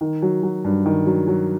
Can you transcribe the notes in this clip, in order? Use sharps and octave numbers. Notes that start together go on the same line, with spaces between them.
D#3
F#3
F#3
G2
D#3
F#3
F#3